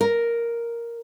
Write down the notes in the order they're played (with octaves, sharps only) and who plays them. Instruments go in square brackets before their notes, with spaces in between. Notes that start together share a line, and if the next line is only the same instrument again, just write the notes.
[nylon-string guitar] A#4